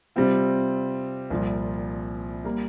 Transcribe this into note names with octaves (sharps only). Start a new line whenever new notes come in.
C3 G3 C4 F4
C2 A#2 F3
G3 A#3